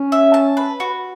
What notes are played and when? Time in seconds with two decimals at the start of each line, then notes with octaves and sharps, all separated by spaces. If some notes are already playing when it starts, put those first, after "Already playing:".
Already playing: C#4
0.12 E5
0.34 A5
0.57 B4
0.80 F#4